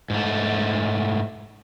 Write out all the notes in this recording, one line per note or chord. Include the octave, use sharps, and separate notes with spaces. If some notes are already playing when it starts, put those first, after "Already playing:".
G#2 A3